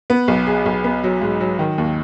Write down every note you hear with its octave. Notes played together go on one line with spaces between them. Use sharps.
B3
B1
G#4
B1
B3
F#3
G#2
F#3
D#3
D#2